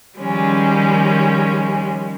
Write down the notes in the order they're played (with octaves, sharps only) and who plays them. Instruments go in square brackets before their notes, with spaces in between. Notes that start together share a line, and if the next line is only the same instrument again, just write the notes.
[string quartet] D#3 F3 G3 G#3 C#4